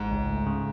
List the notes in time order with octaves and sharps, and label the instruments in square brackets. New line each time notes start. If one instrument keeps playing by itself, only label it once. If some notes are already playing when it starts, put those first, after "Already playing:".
Already playing: [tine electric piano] A1 [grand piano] G#2
[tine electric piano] C#2
A3
C#3